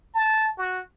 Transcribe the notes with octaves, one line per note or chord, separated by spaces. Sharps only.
A5
F#4